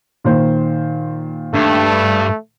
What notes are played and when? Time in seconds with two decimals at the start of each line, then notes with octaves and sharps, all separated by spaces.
0.24 A#2 D#3 C5
1.54 G2 A3